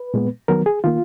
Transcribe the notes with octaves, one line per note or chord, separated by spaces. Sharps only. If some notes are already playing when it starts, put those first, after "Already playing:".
Already playing: B4
A#2 G#3 B3
D#3 F#3 B3 A#4
G#4
D#3 A#3 F4